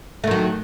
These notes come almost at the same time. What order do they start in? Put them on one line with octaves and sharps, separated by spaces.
A3 D#3 F#3